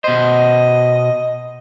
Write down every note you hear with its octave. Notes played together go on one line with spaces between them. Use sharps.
B2 C5 D#5